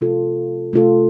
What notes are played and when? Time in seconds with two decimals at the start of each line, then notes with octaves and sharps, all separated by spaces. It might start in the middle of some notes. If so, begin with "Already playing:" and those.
0.01 C3 A3 F4 A4
0.73 C3 A3 F4 A4